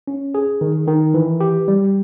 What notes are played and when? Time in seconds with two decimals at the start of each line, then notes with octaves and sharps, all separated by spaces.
0.07 C#4
0.35 G#4
0.61 D#3
0.88 D#3
1.14 E3
1.40 G4
1.68 G3